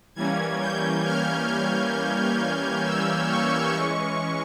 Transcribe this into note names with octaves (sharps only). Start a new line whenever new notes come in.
E3 G3 A#3 C#4 G#6
G6
F6
F6
E6
C#6
E3 G#3 C#4 C#6